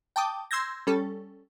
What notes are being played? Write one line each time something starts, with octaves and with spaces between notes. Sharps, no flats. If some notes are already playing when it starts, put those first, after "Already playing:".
G5 A5 D6 D#6
C6 E6 G6 G#6 A#6
G3 C#4 A4